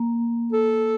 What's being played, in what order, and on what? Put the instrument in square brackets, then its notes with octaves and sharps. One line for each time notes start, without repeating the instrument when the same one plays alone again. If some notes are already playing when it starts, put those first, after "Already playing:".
Already playing: [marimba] A#3
[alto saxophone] A4